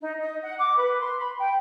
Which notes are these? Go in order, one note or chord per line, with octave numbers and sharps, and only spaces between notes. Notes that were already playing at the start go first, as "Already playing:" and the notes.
D#4
D#5
F#5
D6
B4
C6
B5
G5